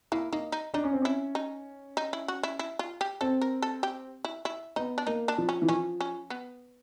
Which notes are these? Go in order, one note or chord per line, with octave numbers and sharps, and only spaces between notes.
A#3 E4
A#3 D#4
D#4
D4 D#4
C#4
C4
C#4 E4
D#4
D#4
E4
F#4
E4
E4
F4
G4
C4 A4
A#4
A4
G4
E4
E4
B3 D#4
D4
A#3 D#4
D4
F3
C#4
E3
F3 C#4
C#4
B3